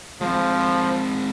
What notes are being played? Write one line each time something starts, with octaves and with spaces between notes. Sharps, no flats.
F3 G#3 C4